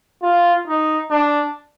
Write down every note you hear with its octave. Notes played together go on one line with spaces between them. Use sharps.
F4
D#4
D4